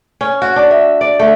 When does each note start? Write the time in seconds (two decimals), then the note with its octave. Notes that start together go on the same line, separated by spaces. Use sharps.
0.21 C#4
0.42 F#4
0.56 D4
0.71 E5
1.01 D5
1.19 A3